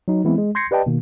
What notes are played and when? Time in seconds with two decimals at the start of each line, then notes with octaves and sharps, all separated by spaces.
0.08 F#3 D#4
0.25 E3 G#3 B3 C4 E4
0.38 G#3
0.55 C6 G6 G#6 A#6 C7 C#7
0.71 G4 B4 D5 D#5 G5 A5
0.86 B2 D#3 A#3